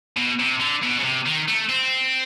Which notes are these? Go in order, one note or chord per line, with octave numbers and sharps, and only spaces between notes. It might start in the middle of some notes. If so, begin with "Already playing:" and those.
B2
C3
D3
B2
C#3
C3
D#3
A3
C4